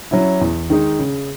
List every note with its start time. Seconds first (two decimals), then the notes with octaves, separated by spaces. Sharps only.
0.11 F#3 C#4 E4
0.41 E2
0.70 D#3 G#3 D#4
0.99 C#3